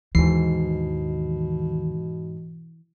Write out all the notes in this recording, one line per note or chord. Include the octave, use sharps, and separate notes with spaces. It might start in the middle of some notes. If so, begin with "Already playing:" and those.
D#2 G#2 B2 E3 C7